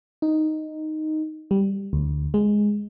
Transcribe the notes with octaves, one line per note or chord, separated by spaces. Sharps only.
D#4
G3
D2
G#3